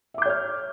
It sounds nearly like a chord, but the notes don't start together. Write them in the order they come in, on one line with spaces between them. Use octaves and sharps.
E5 D6 G6 C#5 F6